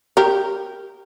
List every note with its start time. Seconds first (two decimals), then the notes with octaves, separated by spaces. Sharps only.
0.17 G4 A#4